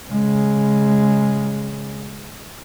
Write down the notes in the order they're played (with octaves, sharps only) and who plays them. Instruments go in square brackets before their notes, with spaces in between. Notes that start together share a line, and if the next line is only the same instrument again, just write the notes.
[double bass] C#3 G#3